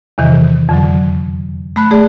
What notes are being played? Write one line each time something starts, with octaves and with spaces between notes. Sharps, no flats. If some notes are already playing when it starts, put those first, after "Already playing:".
E2 C3 D#3 E3
F2 D3 F#3
A3 B5 F#6
A3 G#4 D5